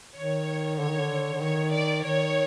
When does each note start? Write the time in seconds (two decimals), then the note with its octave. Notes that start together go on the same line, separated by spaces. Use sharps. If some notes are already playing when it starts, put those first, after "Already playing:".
0.16 D#3 C#5
0.79 D3 C#5
0.90 D#3
1.00 D3
1.34 D3
1.42 D#3 C#5
1.73 D5
2.04 D#3 C#5